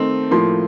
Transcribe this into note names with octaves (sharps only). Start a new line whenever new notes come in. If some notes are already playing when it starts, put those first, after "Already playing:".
Already playing: D#3 A3 C4 D#4
A2 F3 A#3 C6